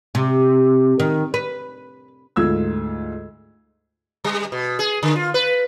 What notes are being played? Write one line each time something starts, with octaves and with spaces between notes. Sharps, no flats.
C3
D#3
B4
D2 G#2 F4 E6 G#6
G3
B2
G#4
D3
F4
B4